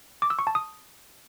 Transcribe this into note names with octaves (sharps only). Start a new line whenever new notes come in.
D6
E6
C#6
A5
D#6